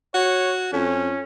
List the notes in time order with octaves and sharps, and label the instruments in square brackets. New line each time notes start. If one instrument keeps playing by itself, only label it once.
[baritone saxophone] F#4 [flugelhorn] C#5
[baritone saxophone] F2 [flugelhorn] C#4